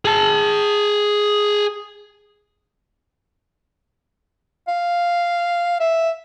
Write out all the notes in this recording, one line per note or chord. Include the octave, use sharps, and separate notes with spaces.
G#4 A5
F5
E5